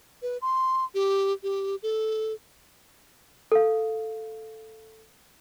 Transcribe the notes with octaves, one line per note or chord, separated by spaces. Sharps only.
B4
C6
G4
G4
A4
A4 F5